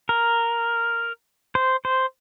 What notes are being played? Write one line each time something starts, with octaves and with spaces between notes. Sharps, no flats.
A#4
C5
C5